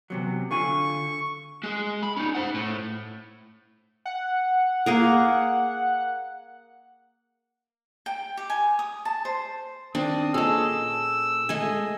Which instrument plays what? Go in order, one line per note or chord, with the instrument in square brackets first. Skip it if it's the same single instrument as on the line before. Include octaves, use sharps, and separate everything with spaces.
[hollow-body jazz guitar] E2 C3 F#3
[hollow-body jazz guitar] D3 F4 G#5 [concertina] C#6
[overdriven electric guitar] G#3 G#4
B5
C#4 D#4
C5 F#5
A2
[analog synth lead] F#5
[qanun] A#3 G#4 A#4
[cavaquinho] G5
G4
G#5
D#6
A5
C5
[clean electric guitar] D#3 C4 [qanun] D4 [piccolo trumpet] D#6
[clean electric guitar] A#2 C#4 A4 [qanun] G#4 D#5 [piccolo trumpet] E6
[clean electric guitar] G#3 A3 [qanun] G#4 D#5 G#5